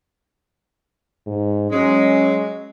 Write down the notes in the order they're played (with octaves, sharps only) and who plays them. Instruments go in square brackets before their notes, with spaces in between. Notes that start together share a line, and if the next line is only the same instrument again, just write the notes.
[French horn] G#2
[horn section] F#3 G#3 [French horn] C#4